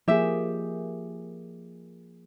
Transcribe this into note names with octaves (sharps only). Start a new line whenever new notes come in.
F3 A#3 G4 G#4 E5